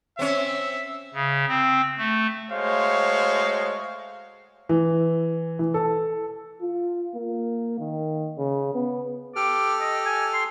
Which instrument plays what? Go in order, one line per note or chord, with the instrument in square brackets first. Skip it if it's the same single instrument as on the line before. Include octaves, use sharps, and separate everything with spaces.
[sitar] C4 C#4 [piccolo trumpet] E5
[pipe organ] C#3
C4
A3
[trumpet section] G#3 A3 F#4 C5 C#5 F5
[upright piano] E3
E3
A4
[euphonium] F4
A#3
D#3
C#3
B3
[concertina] G4 A4 F6 [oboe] D6
[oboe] D#5
G#5
C6